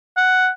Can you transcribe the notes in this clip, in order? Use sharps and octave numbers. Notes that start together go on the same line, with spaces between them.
F#5